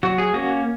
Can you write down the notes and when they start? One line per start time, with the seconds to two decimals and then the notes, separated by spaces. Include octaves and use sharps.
0.03 F#3 F#4
0.18 G#4
0.34 A#3 C#4 F#4